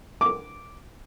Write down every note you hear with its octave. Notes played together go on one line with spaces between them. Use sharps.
D6